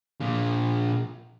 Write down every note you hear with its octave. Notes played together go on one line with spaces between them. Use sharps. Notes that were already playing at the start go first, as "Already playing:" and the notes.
A#2 F3